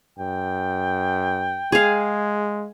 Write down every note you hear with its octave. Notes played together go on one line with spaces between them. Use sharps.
F#2 G5
G#3 G#4 F5